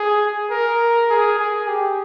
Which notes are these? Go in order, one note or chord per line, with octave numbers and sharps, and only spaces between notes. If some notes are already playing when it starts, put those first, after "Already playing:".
Already playing: G#4
A#4
G#4
G#4
G4